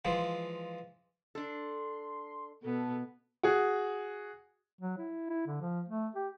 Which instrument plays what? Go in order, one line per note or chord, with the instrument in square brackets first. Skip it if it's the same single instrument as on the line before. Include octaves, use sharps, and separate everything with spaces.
[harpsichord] E3 F3 G#3 F4
[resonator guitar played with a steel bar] D4 A4 [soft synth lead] C6
[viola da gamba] B2 B3 [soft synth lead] A4
[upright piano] F#4 G#4
[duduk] F#3
E4
E4
D3
F3
A3
G4